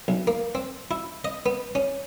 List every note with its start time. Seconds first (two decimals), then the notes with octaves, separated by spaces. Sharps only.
0.08 B1
0.27 A#3
0.55 C4
0.91 E4
1.25 D#5
1.46 B3
1.75 C#4